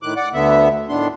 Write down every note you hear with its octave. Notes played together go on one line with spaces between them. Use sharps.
A2 D#3 D6 F#6
D5 F#5 D6
D2 D3 B3 E5
A2 D#3 B3 D4 C6